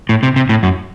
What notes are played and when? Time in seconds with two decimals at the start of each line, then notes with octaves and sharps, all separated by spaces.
0.09 A2
0.23 C3
0.36 C3
0.49 A2
0.63 F#2